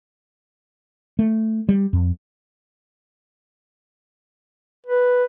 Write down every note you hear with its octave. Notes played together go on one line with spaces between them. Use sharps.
A3
G3
F2
B4